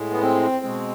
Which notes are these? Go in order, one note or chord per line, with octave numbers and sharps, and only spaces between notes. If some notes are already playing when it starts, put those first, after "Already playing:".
Already playing: A2 G#3
B3
C4
B2 G#3